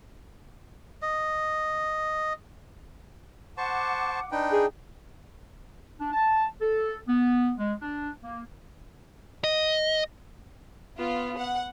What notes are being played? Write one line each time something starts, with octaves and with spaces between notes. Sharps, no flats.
D#5
C5 F#5 A5 C#6 D6
D4 D#4 B4 G5
G#4
D4
A5
A4
B3
G#3
D4
A#3
D#5
B3 F4
F#5